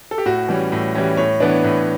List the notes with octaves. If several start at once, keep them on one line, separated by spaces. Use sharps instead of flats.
A4
G4
A2 F#4
E3 G3 C#4
A2
E3 G3 C#4
A2 C#5
E3 B3 D4
A2